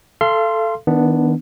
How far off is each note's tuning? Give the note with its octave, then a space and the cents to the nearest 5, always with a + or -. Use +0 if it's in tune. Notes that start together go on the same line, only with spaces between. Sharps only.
A4 +0 F5 -35 C6 +0
D#3 +30 B3 +0 D4 +0